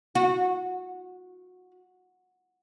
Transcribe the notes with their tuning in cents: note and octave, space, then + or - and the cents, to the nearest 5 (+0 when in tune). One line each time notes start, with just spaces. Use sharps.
F#4 -25